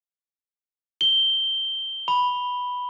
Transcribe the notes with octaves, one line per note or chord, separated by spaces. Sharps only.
G7
B5